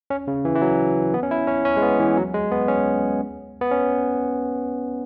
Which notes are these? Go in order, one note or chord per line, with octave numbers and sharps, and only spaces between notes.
C#4
C#3
E3
E3
F#3
B3
C#4
E4
C#4
C#4
G#3
B3
E3
F#3
G#3
B3
C#4
B3
C#4